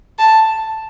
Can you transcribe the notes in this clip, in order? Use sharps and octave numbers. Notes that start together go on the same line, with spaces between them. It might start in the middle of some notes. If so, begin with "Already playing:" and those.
A5